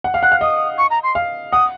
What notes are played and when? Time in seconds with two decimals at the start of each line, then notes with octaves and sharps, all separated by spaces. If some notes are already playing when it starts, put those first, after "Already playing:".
0.04 F#5
0.14 F5
0.23 F#5 F#6
0.32 F5
0.41 D#5 D#6
0.78 C#6
0.90 A#5
1.03 C6
1.15 F5
1.52 F#5 D#6